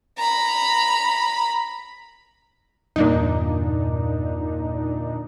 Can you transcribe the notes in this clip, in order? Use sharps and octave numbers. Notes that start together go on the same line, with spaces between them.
A#5 B5
E2 G2 A#2 D3 D4 D#4